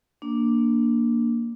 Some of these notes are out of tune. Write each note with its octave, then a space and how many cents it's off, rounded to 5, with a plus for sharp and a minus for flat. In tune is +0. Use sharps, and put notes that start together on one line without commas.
A#3 +0 D4 +0